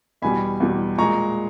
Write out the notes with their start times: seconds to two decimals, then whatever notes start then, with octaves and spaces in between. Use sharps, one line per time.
0.22 E2 B2 G3 G#5 B5
0.60 E2 B2 G3
0.98 A#2 G#3 A#5 C#6